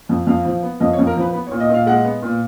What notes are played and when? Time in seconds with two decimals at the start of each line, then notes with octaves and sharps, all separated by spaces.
0.09 F2
0.27 F2 F5
0.45 F3
0.62 B3
0.80 F2 D#5
0.93 C#5
0.99 F2
1.07 A#4
1.16 F3
1.21 B4
1.33 B3 B4
1.47 C#5
1.51 A#2
1.60 D#5
1.69 A#2 F5
1.86 G#3 F#5
2.05 B3
2.22 A#2